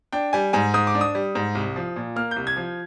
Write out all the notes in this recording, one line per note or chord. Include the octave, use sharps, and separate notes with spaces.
D4 G5
G3 G#5
G#2 G#5
G#2 D#6
D6
D4
D#6
G3
G#2
C2
F3
A#2
A#3 F6
C2 G6
G#6
F3